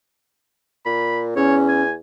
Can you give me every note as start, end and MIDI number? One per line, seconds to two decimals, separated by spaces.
0.85 1.34 46
0.85 1.22 83
1.36 1.99 40
1.36 1.82 61
1.36 1.57 73
1.68 1.92 80